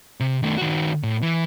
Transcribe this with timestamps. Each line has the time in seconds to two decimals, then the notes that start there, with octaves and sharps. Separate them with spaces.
0.20 C3
0.42 D#3 A3
0.58 D#3 F#4
1.03 A2
1.22 E3